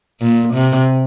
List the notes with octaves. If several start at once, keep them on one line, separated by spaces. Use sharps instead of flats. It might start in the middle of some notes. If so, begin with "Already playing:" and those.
A#2
C3